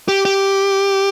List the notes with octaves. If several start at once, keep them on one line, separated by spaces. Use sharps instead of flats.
G4
G4